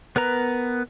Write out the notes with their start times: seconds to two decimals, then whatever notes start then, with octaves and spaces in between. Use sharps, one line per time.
0.16 B3 A#4 B4 A#5